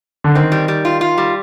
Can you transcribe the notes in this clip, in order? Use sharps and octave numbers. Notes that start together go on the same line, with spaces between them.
D3
D#3 C4
G3
G3
F4
F4
G3